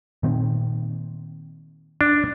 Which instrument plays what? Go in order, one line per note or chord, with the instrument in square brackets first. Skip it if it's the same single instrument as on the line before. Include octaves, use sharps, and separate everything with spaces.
[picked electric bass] A#2 D#3 C4
[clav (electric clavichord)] D4